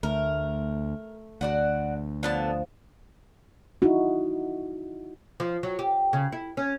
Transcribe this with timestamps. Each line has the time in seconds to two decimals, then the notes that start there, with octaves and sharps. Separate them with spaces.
0.03 D2 A3 A#4
1.41 D2 F#4 D5 F#5
2.23 D3 F3 B3 A5
3.82 D#4 E4 F#4
5.40 F3
5.63 F#3
5.79 G4
6.13 C#3
6.32 E4
6.57 C#4